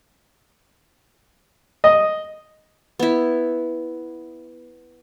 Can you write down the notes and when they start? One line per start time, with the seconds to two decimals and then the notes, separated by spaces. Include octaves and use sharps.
1.84 D#5
2.99 B3 E4